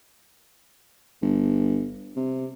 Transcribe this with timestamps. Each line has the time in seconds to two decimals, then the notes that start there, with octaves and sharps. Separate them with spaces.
1.21 G1
2.16 C3